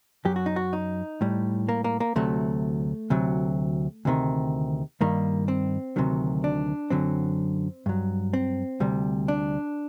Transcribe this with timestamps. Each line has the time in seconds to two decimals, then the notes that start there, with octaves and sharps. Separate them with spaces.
0.25 F#2 F#3 G4
0.36 F#4
0.46 D#4
0.56 F#4
0.73 D#4
1.21 A2 G3
1.69 A#3
1.84 A#3
2.00 A#3
2.16 D2 C3 F#3 A3
3.10 D2 C3 F#3
4.05 D2 C3 D#3
5.01 G2 D#3 G3 A#3
5.48 C4
5.96 D2 C3 D#3 F#3
6.44 D4
6.90 F#2 D3 F#3 C4
7.86 G2 F#3
8.33 C4
8.80 D2 C3 G3
9.28 D4